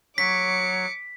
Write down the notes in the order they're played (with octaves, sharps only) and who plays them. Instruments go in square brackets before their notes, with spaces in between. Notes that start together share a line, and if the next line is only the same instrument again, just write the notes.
[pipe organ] F#3 C#5 [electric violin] D6 C#7 [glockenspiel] B6